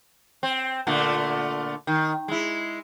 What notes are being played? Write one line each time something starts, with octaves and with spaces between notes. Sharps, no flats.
C4
A#2 D3 A3
D#3
G#3 E4